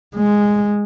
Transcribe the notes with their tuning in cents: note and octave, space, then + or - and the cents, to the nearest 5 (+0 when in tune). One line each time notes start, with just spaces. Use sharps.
G#3 -5